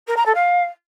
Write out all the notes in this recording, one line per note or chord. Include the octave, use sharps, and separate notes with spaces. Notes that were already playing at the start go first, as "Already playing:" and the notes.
A#4
A#5
A4
F5